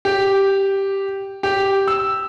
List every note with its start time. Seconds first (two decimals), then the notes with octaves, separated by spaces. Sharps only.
0.05 G4
1.43 G4
1.88 E6